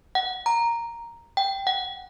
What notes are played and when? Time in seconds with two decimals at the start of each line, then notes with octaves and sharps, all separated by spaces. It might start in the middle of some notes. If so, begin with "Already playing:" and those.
0.15 F#5
0.46 A#5
1.37 G5
1.67 F#5